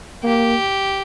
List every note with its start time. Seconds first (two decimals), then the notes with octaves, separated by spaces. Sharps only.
0.24 A#3 G4